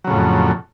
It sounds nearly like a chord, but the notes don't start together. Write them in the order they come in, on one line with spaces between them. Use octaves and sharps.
F#3 C#3 A2 F2